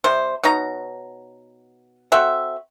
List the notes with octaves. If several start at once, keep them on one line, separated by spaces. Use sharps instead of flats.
C3 G3 C5
B2 D#4 C#5 A#5
C4 F#4 A4 E5